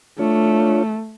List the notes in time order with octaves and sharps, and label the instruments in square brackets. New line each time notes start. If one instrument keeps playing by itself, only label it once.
[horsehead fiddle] A3 [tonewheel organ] D4 F4 C#5